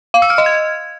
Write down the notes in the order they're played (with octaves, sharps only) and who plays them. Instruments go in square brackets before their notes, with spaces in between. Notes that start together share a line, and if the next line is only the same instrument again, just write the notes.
[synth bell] F5
E6
F6
D#5
G#6